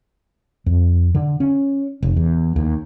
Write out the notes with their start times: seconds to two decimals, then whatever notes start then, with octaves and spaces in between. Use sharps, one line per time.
0.66 F2
1.15 D3
1.40 C#4
2.03 F1
2.16 E2
2.56 D#2